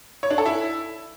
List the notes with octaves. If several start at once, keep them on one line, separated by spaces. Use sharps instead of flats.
C#5
D4
A4
E4